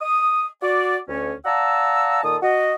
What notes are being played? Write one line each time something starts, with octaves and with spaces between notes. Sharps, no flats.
D#6
F#4 D5
D2 C#4
D5 F5 F#5 A5 A#5 E6
A#2 D#3 A4 D#6
F#4 D#5